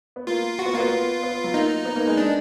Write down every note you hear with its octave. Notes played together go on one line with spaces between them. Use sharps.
B3
A#3 F4
F#4
B3
A#3 F4
B3
B3
F#3
A#3 D#4
B3
A#3
G#3
G#3 D4